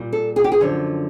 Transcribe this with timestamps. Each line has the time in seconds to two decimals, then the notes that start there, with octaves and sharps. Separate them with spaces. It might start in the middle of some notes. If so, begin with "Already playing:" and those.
Already playing: A#2 G3
0.13 A4
0.36 G#4
0.44 G4
0.52 G#4
0.60 F#2 D3 F3